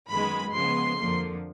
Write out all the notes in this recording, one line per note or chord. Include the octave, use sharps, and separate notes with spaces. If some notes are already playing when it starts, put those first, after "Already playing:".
F#2 D#3 G#3 B3 B5
C#3 F3 G#3 B3 C6
F2 D3 F3 A#3